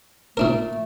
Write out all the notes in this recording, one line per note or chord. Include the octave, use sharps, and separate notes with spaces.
A#2 A3 D4 A#4